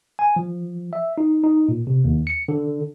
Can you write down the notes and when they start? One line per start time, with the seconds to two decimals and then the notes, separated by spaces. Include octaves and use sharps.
0.19 G#5
0.36 F3
0.93 E5
1.18 D#4
1.43 D#4
1.69 A#2
1.87 C3
2.04 D#2
2.27 C#7
2.48 D3